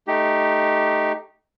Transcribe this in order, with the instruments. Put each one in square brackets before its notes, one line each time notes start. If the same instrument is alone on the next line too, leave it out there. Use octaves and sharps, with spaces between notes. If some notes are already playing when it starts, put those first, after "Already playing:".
[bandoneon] A3 D#4 G4